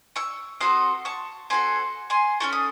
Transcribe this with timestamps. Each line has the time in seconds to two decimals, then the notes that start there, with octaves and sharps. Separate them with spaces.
0.16 C#6 E6
0.60 C4 F#4 A4 C6 D#6
1.05 A5 C#6
1.50 C4 F#4 A4 G#5 C6
2.10 G#5 C6
2.40 C#4 F#4 A4 C#6
2.53 D#6